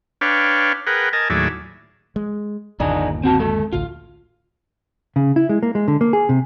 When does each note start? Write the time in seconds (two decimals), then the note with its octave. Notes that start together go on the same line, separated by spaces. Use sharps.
0.21 D4 B4 C#5 F5 G5
0.87 G#4 A#4 B4 F#5 G5
1.13 A#4 D#5 G#5 A5
1.30 D#2 A2 F#3 G#4 D5 E5
2.16 G#3
2.80 G1 D#2 A#2 D4 D#4 G#4
3.23 C4 F#4 A5
3.39 G#3 A4
3.73 A1 D2 F4
5.16 C#3
5.36 E4
5.49 G#3
5.63 A#3
5.75 G#3
5.88 D3
6.01 A#3
6.13 G#4
6.29 C3